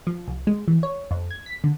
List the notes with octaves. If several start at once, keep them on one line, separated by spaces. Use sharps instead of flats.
F3
C2
G#3
E3
C#5
F2
G#6
B6
D3